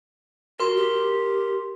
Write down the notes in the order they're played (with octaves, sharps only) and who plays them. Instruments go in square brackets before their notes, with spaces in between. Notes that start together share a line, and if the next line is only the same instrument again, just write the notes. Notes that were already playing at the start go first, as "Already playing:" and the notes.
[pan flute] F#4 [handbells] A#4 C6
[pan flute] G4